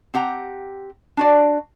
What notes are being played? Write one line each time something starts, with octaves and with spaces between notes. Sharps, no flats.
C4 G4 F#5 A#5
D4 F#4 D5